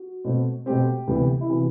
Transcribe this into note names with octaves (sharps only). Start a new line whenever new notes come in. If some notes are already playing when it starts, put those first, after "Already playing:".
Already playing: F#4
B2 A3 C4
B2 A3 C4 G4
D2 C3 E3 B3
E4
C3 E3 B3 F#4